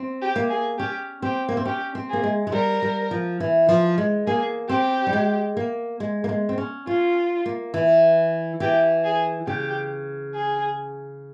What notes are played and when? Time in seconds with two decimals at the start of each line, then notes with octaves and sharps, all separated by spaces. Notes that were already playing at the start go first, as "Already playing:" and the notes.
Already playing: C4
0.22 G4
0.36 A#3
0.50 G#4
0.79 C#4 G4
1.22 C4 G4
1.48 A#3
1.57 C4
1.65 C#4 G4
1.95 C4
2.09 A#3 G#4
2.24 G#3
2.47 G#3
2.52 G3 A#4
2.82 G3
3.11 F3
3.40 E3
3.69 F3
3.98 G#3
4.27 A#3 G#4
4.69 C4 G4
5.07 G3
5.13 G#3
5.57 A#3
6.00 G#3
6.24 A#3
6.29 G#3
6.49 C4
6.58 C#4
6.87 C#4 F4
7.46 A#3
7.74 E3
8.60 E3 G4
9.04 G#4
9.47 C#3 G4
10.34 G#4